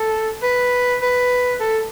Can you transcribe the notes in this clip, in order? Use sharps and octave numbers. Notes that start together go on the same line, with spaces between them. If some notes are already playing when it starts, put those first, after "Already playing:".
Already playing: A4
B4
B4
A4